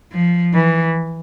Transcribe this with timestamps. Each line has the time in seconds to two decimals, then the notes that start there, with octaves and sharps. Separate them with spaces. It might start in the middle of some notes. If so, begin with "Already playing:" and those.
0.12 F3
0.54 E3